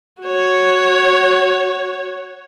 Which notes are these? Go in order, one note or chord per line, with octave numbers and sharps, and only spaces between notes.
F#4 C#5